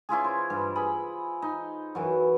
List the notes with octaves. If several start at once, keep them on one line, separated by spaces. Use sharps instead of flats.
C#4 E4 F4 G#4
C5
G2 G3
G#4 B5
D#4
F#2 E3 F#3